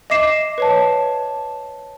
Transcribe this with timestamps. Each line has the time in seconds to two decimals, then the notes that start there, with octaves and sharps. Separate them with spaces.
0.10 D#5 E5 D6 C7 E7
0.58 B4 C#5 A5